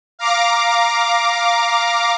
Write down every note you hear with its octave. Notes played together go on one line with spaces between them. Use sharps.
F5 A#5 D6